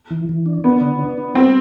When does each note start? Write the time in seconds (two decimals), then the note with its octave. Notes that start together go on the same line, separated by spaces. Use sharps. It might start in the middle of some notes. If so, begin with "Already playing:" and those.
0.11 E3
0.29 E3
0.46 D4
0.64 B3 D4
0.81 D3
0.99 D4
1.18 D4
1.34 G3 C4